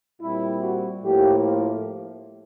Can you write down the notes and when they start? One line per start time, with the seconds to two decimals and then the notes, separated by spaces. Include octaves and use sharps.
0.21 A#2 G3 C4 E4
0.62 F#4
1.03 A2 F3 A#3 G4